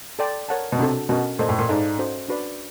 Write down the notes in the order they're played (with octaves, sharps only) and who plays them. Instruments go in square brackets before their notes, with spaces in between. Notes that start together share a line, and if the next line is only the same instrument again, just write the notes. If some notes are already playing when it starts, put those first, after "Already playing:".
[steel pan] A4 D5 G5 C6
A#4 C#5 F#5 A5
[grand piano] B2
[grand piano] C3 [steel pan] D4 F#4 A4
[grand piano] B2 [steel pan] C#4 F#4 A#4 D#5
[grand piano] A#2 [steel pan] A4 C5 D#5
[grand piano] A2
A#2
[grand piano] G#2 [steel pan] A4 D5 F5
[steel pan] C#4 F#4 A4 C5
D4 F#4 B4 D5